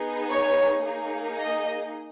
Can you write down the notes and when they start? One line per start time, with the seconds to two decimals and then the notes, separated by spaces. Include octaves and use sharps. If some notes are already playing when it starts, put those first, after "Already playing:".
Already playing: B3 D#4 G#4
0.29 C#5
0.83 A#3 D#4 G#4
1.37 D#5